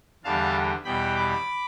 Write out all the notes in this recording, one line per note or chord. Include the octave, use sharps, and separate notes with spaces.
E2 D3 G3 F5 A5
E2 B2 G3 G5 B5
B5 D6